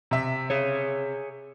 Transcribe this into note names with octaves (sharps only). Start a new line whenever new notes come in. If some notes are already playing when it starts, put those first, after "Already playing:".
C3 E5
G#4 C#5